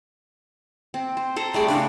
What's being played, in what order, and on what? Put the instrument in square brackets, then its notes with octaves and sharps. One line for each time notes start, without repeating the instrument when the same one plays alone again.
[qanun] C4
C5
A4 C5 A#5
[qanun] G3 A3 D5 [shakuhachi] G#4
[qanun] C#3 [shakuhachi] D4